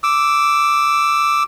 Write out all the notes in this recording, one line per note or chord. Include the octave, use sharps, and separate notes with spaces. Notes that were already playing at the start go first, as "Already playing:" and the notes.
D6 E6